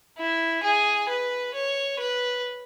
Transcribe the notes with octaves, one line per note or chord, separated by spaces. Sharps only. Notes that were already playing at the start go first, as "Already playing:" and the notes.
E4
G#4
B4
C#5
B4